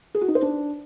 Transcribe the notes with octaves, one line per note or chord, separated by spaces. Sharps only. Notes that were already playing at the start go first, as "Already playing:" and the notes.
G#4
F#4
D#4
C5
D4